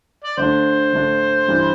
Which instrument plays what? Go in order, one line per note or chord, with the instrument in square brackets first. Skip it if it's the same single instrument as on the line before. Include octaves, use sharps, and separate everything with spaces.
[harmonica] D5
[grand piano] D3 A3 D4 [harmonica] C5
[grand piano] D3 A3 D4
G2 E3 G3 D4